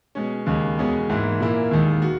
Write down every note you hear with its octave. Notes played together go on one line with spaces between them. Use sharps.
B2 G#3 C#4
D#2 C#3 G#3
E2 B2 G#3 C#4 G#4
G#2 E3 A#3 E4
A#2 A#3 E4
D#2 D#3 G#3
F#4